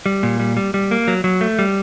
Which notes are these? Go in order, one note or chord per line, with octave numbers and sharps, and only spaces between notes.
G3
A#2
G3
G3
G3
A#3
F#3
F#3
A3
G3